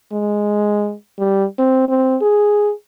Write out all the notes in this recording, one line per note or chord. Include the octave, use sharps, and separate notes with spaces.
G#3
G3
C4
C4
G#4